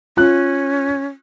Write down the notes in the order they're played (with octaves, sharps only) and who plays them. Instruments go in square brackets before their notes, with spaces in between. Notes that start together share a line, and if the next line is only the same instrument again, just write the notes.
[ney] C#4 [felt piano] F4 F#6